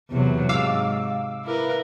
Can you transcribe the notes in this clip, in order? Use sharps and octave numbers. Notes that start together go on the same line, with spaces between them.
E2 C3 F#3
G#2 F5 D6 E6
E4 A#4 B4